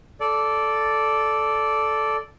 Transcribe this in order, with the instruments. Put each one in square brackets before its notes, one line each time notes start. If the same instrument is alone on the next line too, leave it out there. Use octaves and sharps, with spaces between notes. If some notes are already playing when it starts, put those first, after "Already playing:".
[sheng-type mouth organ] A4 D5